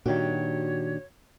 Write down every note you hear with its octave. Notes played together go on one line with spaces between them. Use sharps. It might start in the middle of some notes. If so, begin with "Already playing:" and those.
A#2 D#3 D4 F#4 G4 C#5